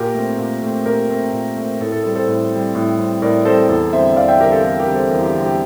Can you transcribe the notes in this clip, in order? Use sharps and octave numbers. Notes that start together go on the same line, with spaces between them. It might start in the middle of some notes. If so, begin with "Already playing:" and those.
Already playing: A#2 G4 A#4
A3 C4
A#2
A3 C4
A#2 G4 A#4
A3 C4
A#2
A3 C4
A2 A4
A4
G3 C4 A4
A4 C5
A2
G3 C4
A2
G3 C4
A2 A#4 D5
G3 C4 A4 C5
E2 A4
D3 G3 C4 C5 E5
E2 D5 F5
E5 G5
D3 G3 C4 G4 A#4
A4
E2 A4
G4 A#4
D3 G3 C4
A4 C5
E2 G4 A#4
G4
D3 G3 C4
G4